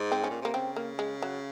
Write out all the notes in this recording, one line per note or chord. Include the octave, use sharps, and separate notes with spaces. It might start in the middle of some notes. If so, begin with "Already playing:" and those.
Already playing: G#2
C4
C#4
A#2
C3 A#3
C#3 C4
A#3
G#3
F#3